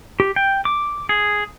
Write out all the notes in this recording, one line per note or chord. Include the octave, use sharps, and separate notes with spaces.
G4
G5
D6
G#4